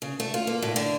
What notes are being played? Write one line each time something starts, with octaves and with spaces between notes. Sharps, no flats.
C#3
A3
F4
A#3
A2
D3